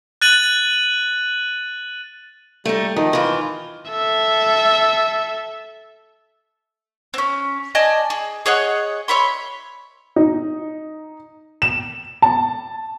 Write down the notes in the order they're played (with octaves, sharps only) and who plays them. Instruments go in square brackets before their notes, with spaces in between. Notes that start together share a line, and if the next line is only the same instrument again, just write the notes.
[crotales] F#6 A6 D#7 F#7
[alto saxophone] G3 [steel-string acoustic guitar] A3 D#4
[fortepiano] D#3 [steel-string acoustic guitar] F3 [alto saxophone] D#4
[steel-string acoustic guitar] E3 F4
[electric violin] A4 E5
[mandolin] C4 C#4
D5 D#5 G#5 A5
G#4
G#4 C#5 D#5 F#5
C#5 E5 B5 C6
[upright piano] D#4
E7
A5